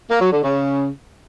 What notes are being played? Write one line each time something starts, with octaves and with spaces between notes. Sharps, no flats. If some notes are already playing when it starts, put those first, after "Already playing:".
A#3
F#3
D3
C#3